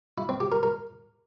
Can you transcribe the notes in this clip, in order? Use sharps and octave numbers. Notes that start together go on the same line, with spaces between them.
E4
C4
G4
A#4
A#4